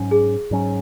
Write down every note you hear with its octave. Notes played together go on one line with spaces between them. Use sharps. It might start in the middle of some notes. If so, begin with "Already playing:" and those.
Already playing: G#2 F#3 C#4
G#4
G#2 F#3 C#4